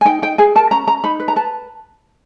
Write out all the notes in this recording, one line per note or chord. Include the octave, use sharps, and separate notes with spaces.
G#5
D#4 G5
D#4 G5
G#4 G#5
A#4 A5
C#4 A#5
C#4 A#5
D#4 B5
B4
A#5
B4 A5